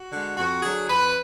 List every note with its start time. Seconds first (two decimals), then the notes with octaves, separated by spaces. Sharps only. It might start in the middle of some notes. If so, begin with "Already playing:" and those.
Already playing: F#4
0.11 D3 G#3
0.37 F2 F#4
0.62 D3 F#3 G#4
0.89 F2 B4